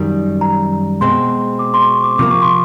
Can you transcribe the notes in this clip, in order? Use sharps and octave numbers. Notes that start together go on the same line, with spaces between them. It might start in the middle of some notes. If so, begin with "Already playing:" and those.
Already playing: F#2 D#3 G3
A#5
B2 G#3 C4 C6
D6
C6
C#6
D6
C3 F3 A#3 D6
C#6
C6